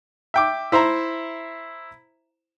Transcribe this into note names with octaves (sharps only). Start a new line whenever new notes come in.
E5 G5 D6
E4 C5 E5 A#5